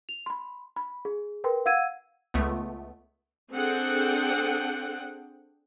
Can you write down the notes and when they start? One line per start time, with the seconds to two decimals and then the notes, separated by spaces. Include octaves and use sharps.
0.09 F7
0.26 B5 C6
0.76 B5
1.05 G#4
1.44 A#4 B4 G5 C6
1.66 F5 F#5 E6 G#6 D#7
2.34 C#2 A3 B3
3.53 C4 D4 G#4 A4 F#5 G5